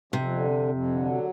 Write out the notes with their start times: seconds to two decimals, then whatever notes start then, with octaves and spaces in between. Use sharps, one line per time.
0.13 F2 C3
0.31 D3
0.50 F2
0.68 F2
0.87 D3
1.05 F#3